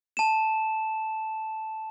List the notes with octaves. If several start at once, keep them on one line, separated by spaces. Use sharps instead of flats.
A5 E7